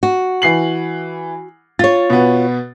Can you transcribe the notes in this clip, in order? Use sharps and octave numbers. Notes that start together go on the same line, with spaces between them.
F#4
E3 C7 F#7
F4 C#5 A6
B2 B3